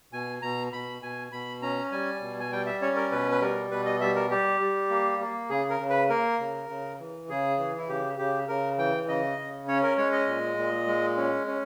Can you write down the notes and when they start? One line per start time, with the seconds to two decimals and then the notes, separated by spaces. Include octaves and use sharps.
0.13 B2 G#5
0.42 B2 A#5
0.73 B2 B5
1.02 B2 G#5
1.32 B2 B5
1.62 C#4 A#5
1.92 G3 G#5
2.22 B2
2.40 G#5
2.52 G3 G5
2.66 E5
2.82 C#4 C#5
2.96 A#4
3.11 B2 B4
3.32 B4
3.41 G3 A#4
3.71 B2 B4
3.86 D#5
4.01 G3 E5
4.16 A#4
4.31 G3 G4
4.60 G3
4.90 A#3
5.20 A#3
5.50 C#3 G#4
5.70 A#4
5.80 C#3
5.90 B4
6.10 A#3 A#4
6.40 C#3
6.69 C#3
7.00 E3
7.29 C#3 G#4
7.59 E3
7.78 E4
7.89 C#3 G4
8.18 C#3 G4
8.48 C#3 A#4
8.78 E3 G5
9.08 C#3 D#5
9.38 C#3
9.68 C#4 C#5
9.83 A#4
9.98 G#3 C#5
10.12 D#5
10.28 A#2
10.57 A#2
10.87 G#3
11.17 C#4
11.47 C#4